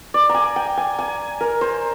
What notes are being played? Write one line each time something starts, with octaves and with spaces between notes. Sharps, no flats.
D5
A#5
G#5
G5
G#5
G#5
A#4
C5